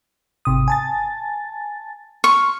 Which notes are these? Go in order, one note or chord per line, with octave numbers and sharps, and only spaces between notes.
G#1 C3 D#6
G#5 A5 A6
C6 C#6 F6